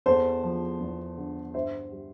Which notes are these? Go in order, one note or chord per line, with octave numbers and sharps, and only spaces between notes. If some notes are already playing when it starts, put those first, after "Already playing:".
E2 A4 C5
F3
E2
D3
G2 C5 E5
G3